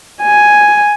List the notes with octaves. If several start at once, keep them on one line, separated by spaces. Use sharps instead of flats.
G#5